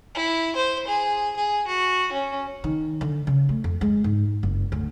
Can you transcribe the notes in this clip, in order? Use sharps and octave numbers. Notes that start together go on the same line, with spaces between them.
E4
C5
G#4
G#4
F#4
C#4
D#3
D3
C#3
A3
F2
G#3
G#2
F#1
D2